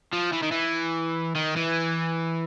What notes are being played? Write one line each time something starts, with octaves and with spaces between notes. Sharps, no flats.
F3
E3
D#3
E3
D#3
E3